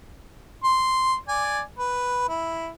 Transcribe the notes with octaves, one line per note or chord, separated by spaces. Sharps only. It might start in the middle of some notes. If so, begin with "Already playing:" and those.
C6
D5 G#5
B4
E4